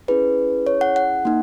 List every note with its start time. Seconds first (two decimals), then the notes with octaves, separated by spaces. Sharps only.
0.08 C#4 E4 G#4 B4
0.67 C#5
0.81 F#5
0.96 F#5
1.25 A#3 D#4